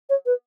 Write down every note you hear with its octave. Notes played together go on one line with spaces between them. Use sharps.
C#5
B4